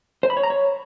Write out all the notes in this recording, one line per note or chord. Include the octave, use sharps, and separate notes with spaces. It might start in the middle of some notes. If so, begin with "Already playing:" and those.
C5
B5
C#5
A#5
C#5